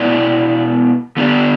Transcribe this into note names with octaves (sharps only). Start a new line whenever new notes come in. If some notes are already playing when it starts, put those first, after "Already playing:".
Already playing: B2 B3 E4 B4 D5
D3 B3 D4 G4 D5